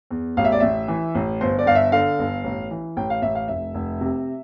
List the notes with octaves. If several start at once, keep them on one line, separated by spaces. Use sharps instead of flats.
E2
A1 F5
E5
D5
A1 E5
E3
A1
G1 C5
D5
G1 F5
E5
D3 F5
G1
A1
E3
A1 G5
F5
A1 E5
F5
F1 E5
F1
C3